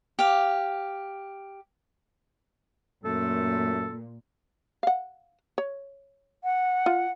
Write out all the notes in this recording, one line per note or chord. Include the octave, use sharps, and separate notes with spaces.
G4 F5
F#2 A#2 A3 A4
F5 F#5
C#5
F#5
F4